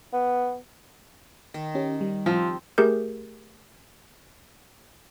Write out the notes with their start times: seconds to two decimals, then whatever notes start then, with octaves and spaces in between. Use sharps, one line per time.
0.13 B3
1.54 D#3
1.75 C#4 G4
2.01 G3
2.26 F3 C4
2.78 A3 G4 G#4 A#4 G6